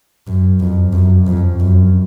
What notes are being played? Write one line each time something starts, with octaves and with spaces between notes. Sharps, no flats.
F#2
F2
F#2
F2
F#2